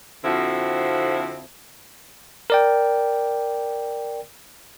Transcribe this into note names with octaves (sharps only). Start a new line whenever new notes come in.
F2 D3 F3 C4 E4 F#4
A#4 D5 G5